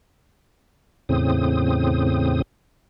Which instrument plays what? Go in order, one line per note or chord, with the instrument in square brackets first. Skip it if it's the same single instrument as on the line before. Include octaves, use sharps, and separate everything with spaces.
[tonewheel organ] E2 A2 C#3 C4 D#6